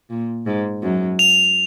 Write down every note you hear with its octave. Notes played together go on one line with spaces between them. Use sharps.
A#2
G#2
F#2
F7